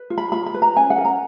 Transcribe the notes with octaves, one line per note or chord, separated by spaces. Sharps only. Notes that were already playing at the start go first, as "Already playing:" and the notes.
Already playing: B4
F4
B5
F4 B5
B5
B4
A#5
C#4 G#5
F#5
A#4
A#5